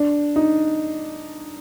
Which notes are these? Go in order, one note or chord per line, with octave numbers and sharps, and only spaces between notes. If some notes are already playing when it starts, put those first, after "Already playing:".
Already playing: D4
D#4